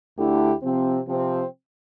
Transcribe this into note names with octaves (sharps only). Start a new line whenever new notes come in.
D2 D3 A3 E4 G4
C3 F3 C4
C3 F3 C4